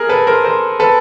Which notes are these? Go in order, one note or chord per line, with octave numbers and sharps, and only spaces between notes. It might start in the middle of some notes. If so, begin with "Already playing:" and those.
Already playing: G#4 A#4
A4 B4
A#4 C5
A#4 C5
A4 B4